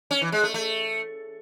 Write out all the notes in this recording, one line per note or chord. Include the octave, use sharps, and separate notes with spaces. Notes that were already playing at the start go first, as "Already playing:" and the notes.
C#4
E3
G#3
A3
A3